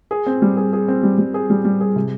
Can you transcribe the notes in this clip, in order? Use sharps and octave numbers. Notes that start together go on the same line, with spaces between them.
G#4
C4
G3
G#4
G#4
C4
G3
G3
G#4
G3
G3
G#4
C3